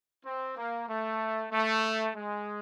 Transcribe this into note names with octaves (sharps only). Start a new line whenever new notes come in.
C4
A#3
A3
A3
G#3